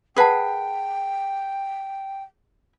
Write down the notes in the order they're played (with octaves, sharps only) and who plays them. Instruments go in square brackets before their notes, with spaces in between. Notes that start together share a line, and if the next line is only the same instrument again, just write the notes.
[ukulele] G#4 B4 [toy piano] A#4 F#5 A5 [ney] G5